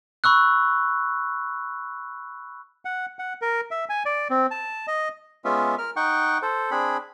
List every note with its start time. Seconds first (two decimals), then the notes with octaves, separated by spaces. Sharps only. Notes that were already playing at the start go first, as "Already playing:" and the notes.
0.24 B5 C#6 E6 F#6
2.85 F#5
3.19 F#5
3.42 A#4
3.71 E5
3.89 G#5
4.06 D5
4.30 C4
4.51 A5
4.87 D#5
5.45 G#3 B3 C#4 F4 E5
5.78 A#4 F6
5.96 D#4 F#5 G5 C#6
6.42 A4 C5
6.71 C4 D4 G#4 B5